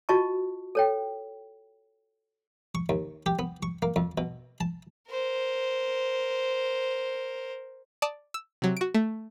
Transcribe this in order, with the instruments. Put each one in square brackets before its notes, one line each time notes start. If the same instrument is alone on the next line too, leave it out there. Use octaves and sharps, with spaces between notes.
[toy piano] F4 F#4 D#5 A5 C#6
A4 C#5 G5
[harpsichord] C#6
D#2
G4
B3
C#6
A#3
F2
B2
A5
[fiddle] A#4 C5
[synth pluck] D5 A5 D#6
E6
C3 F#3
F#4 D7
A3